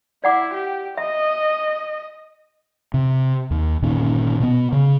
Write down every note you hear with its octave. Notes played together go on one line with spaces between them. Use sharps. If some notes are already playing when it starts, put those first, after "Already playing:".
E4 D5 F#5 D6
G4
D#5 E5
C3
D#2
G1 A#2 D#3 C#4
B2 B3
C#3